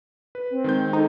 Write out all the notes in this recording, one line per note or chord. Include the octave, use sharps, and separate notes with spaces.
B4
C4
D#3 G#3 G6
D#4 A4